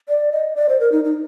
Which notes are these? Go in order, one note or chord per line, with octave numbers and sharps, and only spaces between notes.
D5
D#5
D5
C5
A#4
D#4
D#4